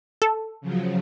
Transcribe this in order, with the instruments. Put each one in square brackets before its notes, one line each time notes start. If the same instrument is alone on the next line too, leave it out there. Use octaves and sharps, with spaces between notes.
[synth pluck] A4
[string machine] C#3 F3 F#3